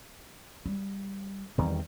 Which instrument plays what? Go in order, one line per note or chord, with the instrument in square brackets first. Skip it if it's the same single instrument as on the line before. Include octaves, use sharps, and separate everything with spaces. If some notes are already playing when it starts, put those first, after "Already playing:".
[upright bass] G3
[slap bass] E2 D#3 G3 [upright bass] C4